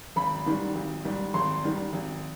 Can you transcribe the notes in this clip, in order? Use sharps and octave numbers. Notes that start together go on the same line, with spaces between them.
G#1 B5
G#2 D#3 G3
G#1
G#2 D#3 G3
G#1 C6
G#2 D#3 G3
G#1